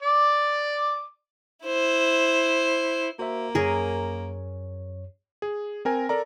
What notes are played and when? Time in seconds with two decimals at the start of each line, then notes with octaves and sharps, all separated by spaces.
0.03 D5 D6
1.66 E4 C5
3.19 A#3 F#4 C5 E5
3.55 F#2 G#4 A#4 C#5
5.42 G#4
5.85 C4 A#4 G#5
6.09 A4 A#4 D5 A#5